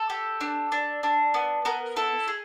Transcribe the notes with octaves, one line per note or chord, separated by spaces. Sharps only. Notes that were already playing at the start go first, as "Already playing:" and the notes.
Already playing: A4
G4
D4
D4
D4
B3
B3 A#4
E4 A4
G#4